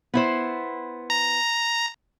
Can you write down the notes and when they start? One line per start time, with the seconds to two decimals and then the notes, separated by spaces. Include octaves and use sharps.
0.14 B3 E4 C5
1.10 A#5